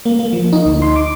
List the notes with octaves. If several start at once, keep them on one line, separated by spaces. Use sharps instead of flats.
A#3
A#3
F3
D#4
D2
C6
D6